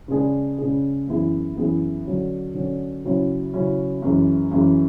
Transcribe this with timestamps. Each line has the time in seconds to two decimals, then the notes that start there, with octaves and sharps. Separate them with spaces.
0.08 C#3 G#3 D4 G#4
0.58 C#3 G#3 D4 G#4
1.08 F#2 E3 B3 E4 G#4
1.56 F#2 E3 B3 E4 G#4
2.05 D3 F#3 C#4
2.54 D3 F#3 C#4
3.04 C#3 F#3 C#4 E4
3.54 C#3 F#3 C#4 E4
4.02 F#2 E3 G#3
4.51 F#2 E3 G#3